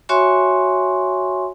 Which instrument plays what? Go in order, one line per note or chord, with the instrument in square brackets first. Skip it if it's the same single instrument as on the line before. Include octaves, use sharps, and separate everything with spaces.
[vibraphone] F#4 C#5 E5 G#5 C6 C#6